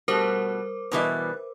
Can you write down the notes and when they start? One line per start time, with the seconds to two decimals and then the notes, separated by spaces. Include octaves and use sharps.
0.08 B2 G3 A3 F#4 A#4 C5 D6
0.92 B2 E3 G3 B4 E5